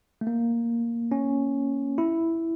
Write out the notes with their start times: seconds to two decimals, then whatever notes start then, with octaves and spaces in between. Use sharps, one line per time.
0.21 A3
0.27 A#3
1.11 C#4
1.98 E4